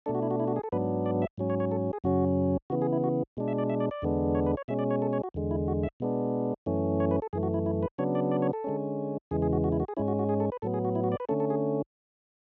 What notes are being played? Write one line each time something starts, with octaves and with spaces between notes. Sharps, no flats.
B2 A3 D4 A4
F#4
E4
F#4
E4
F#4
G#4
A4
G#2 F#3 B3 D4 B4
D5
E5
G#2 F#3 C#4
C#5
C#5
A4
G#4
F#2 C#3 F#3 C#4 F#4
C#3 E3 B3 F#4
G#4
E4
F#4
B2 G#3 D4
E5
D5
E5
D5
D5
E2 D3 G#3 B3 D4
C#5
B4
C#5
B2 G#3 C#4 E5
D5
C#5
A4
C#5
F#4
E2 D3 G#3
E4
F#4
E5
B2 G#3 B3 D4
F#2 E3 A3 C#4
C#5
B4
A4
F#2 E3 A3 G#4
F#4
E4
E4
B4
C#3 F#3 B3 D4 C#5
D5
D5
C#5
A4
D3 G#3 C#4
E2 C#3 E3 G#3 G#4
G#4
F#4
F#4
E4
F#4
G#4
G#2 G#3 C#4 E4
F#4
F#4
G#4
A4
B4
A2 F#3 B3 A4
G#4
F#4
E4
F#4
D5
B4
D3 A3 C#4 A4
A4
G#4